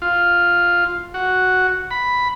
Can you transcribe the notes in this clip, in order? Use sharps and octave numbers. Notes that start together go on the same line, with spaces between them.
F4
F#4
B5